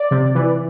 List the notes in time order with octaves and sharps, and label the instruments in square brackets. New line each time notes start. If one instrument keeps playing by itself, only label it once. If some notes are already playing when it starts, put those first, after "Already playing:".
Already playing: [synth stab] D5
C3
E3